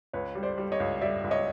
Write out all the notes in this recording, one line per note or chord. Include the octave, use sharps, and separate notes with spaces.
C#2 B4 C#5
G3
C5 D5
G3
C#5 D#5
C#2
G3 D5 E5
C#2
C#5 D#5